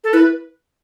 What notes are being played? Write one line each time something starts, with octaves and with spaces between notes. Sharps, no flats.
A4
E4 B4